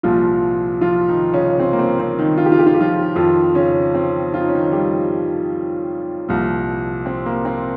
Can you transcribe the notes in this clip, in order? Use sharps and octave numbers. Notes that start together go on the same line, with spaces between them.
C2 A#2 F3 F4
F3 F4
D#3 D#4
C#3 C#4
C4
A#3
C4
C4
D#3 D#4
F4
G4
F4
G4
F4
G4
F3 F4
F2 D#3 F3 F4
C#3 C#4
C4
F4
D#4
C#4
D#3 D#4
G3 G4
C2 A#2 F3
C4
A#3
C4